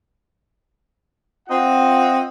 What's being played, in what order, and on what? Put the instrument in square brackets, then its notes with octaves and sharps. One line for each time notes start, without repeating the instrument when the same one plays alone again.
[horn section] C4 F4 D#5 F#5